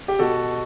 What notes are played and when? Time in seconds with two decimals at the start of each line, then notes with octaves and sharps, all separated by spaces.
0.08 G4
0.19 B2 F#4 A4